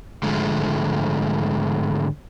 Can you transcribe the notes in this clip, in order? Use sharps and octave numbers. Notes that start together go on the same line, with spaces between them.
G#2 D3 F3 G#3 A3